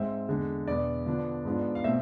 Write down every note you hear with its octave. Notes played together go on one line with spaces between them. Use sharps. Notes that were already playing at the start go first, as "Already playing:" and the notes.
Already playing: G#2 G#3 C4 E5
E2 D3 G#3
E2 B2 B3 D4 D5
D3 F3 B3 D4
G#2 F3 B3 D4
F5
B2 A3 C4 E5